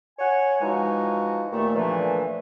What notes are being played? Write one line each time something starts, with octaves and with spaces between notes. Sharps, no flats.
C#5 F#5 G#5
E3 F3 G#3 D#4 F#4
D#2 A#2 A3
A#2 D3 E3 F3 A3